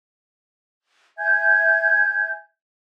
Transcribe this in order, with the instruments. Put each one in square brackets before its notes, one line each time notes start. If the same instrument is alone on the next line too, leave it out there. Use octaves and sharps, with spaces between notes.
[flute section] E5 G#5 G6 G#6